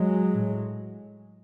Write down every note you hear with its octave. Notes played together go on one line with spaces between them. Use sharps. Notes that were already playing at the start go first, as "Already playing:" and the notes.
Already playing: F#3 G#3
A2